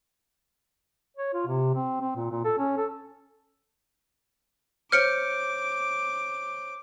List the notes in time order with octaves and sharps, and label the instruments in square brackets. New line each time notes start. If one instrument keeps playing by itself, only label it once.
[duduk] C#5
F4
C3
C4
C4
A#2
A#2
A4
C#4
A4
[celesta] C5 C#5 G6 [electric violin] D6 [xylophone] F6 C#7 D7